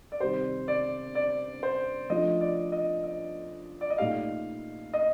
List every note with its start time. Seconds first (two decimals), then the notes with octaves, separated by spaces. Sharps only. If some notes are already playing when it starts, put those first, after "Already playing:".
0.12 D5
0.20 C3 D#3 G3 C4 G4 C5
0.68 D5
1.15 D5
1.63 C5
2.10 F3 A3 D4 F4 D#5
2.41 D5
2.72 D#5
3.04 D#5
3.81 D5
3.90 D#5
3.98 A#2 A3 D#4 G4 F5
4.94 D#5